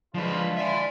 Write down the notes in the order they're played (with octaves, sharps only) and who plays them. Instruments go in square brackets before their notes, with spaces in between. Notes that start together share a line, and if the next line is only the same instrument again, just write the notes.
[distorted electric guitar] F3 B4 [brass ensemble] G#3 D4 F4
[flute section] D5 C6 [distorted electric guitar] E5 G#5